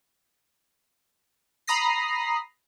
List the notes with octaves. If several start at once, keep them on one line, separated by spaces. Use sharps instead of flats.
A#5 B5 D#6 A#6 C7